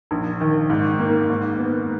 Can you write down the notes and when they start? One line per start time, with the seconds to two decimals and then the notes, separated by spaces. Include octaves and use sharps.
0.11 A#1
0.41 D#3
0.70 G#2
0.99 A#3
1.29 G#2
1.59 B3